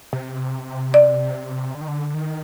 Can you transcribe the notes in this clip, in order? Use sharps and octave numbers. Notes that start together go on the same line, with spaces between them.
C3
D5
D3
D#3
D3
D#3